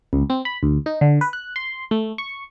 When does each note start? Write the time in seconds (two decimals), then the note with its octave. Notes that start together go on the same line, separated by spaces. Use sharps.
0.13 C#2
0.30 C4
0.45 B5
0.63 D2
0.86 D#4
1.01 D3
1.21 B4
1.33 F#6
1.56 C6
1.91 A3
2.18 C#6